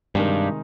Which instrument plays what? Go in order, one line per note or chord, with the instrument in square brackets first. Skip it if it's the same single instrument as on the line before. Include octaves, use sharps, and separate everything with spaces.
[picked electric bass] G2 [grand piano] C3 D#3 G#3 D#4 A#4